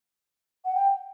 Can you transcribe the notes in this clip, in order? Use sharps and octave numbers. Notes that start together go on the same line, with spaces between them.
F#5
G5